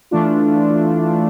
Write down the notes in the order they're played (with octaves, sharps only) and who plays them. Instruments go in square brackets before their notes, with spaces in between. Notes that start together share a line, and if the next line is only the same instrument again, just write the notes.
[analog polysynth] E3 A3 D4 F4